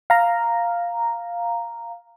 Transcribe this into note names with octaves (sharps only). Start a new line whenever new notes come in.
F5 A#5